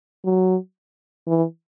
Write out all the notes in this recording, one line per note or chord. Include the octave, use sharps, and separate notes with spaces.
F#3
E3